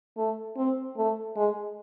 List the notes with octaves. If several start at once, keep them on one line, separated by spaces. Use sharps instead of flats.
A3
C4
A3
G#3